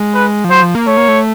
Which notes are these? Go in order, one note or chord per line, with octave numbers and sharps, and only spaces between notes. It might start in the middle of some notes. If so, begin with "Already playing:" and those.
Already playing: G#3
B4
F3
F#3 C5
F3
A#3
A3 C#5
A#3
A3